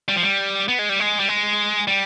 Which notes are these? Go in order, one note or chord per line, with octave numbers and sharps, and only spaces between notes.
G3
F3
G3
B3
G#3
G3
G#3
G3
G#3
G3